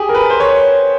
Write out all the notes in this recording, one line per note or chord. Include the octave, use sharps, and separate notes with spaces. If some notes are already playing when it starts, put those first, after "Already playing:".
Already playing: G4 G#4
A#4
B4
C5
C#5